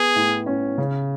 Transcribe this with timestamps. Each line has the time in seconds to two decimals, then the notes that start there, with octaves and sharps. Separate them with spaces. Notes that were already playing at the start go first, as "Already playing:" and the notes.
Already playing: B3 G#4
0.16 A2
0.46 C#4
0.78 C#3